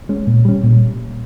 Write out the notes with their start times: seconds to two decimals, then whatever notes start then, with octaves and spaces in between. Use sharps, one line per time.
0.09 G#3 C#4
0.27 A#2
0.45 G3 C#4
0.63 A#2